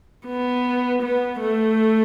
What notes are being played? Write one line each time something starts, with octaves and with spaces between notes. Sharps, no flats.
B3
B3
A3